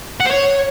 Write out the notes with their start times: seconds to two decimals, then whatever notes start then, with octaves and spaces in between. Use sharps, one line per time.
0.20 F#5
0.26 C5
0.31 C#5